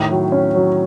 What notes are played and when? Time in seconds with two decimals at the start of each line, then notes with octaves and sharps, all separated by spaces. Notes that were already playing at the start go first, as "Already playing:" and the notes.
Already playing: A2 D#3
0.11 F#3
0.32 C#4
0.55 F#3